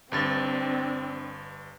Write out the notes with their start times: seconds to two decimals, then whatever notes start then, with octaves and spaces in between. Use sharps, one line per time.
0.12 G1 G2 C4 D4 A6